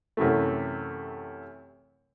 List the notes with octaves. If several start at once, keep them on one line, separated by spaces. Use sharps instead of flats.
F#2 C3 E3 A3